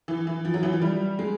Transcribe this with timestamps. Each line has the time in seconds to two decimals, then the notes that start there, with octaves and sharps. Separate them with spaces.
0.08 E3
0.27 E3
0.45 F3
0.54 F#3
0.63 E3
0.73 F3
0.82 G3
1.19 G#3